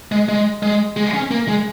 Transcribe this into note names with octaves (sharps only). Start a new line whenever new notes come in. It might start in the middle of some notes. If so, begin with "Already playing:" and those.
G#3
G#3
G#3
G#3
C#4
A#3
G#3